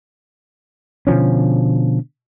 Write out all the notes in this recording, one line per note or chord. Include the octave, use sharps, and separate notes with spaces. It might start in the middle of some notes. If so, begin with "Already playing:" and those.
B2 D3 F3 C#4